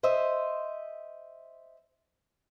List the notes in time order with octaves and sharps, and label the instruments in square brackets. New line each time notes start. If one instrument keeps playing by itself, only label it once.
[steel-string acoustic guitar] C5 D#5 E5